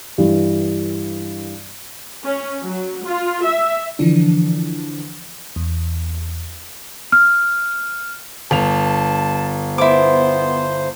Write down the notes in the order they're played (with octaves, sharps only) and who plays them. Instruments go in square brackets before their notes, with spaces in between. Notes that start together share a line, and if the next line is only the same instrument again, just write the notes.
[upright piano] G2 E3
[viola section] C#4
F#3
F4
E5
[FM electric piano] D3 E3 F3 D4
E2
[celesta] F6
[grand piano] G1 F7 [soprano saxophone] A5
[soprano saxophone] B3 [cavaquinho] E4 D6 [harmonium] C5